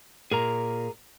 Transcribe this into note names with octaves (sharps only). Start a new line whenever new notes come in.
A#2 G#4 A#4 A#5